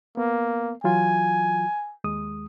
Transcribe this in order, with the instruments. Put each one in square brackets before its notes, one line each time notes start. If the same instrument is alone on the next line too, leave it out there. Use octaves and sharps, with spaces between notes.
[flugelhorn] A#3 [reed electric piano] B3
[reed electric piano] E3 F#3 F4 [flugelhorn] G#5
[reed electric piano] D#2 G#3 D#6